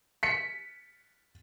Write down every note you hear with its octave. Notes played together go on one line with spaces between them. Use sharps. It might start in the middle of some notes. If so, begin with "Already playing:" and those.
B6 C#7